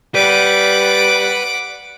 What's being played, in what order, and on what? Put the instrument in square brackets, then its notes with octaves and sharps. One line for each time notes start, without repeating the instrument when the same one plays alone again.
[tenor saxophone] G3 [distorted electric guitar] B4 [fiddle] F#5 D6